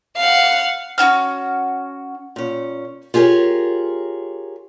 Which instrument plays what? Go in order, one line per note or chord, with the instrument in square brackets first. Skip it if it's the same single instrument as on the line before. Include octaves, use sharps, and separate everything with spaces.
[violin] F5 F#5
[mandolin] C#4 E4 F#4 F6
[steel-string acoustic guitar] A#2 C#4
F4 G4 G#4 A#4 C#5